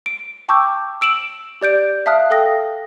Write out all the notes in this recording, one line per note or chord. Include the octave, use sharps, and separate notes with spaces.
D7
G5 A5 C#6 D6 E6 G6
E6 D7 E7 F#7
G4 D5 G6 D7
E5 F5 A5 D#6 F6 F#6
A4 F5 G5 D#6 A#6